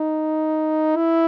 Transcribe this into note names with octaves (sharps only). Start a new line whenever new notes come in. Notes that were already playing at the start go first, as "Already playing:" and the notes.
Already playing: D#4
E4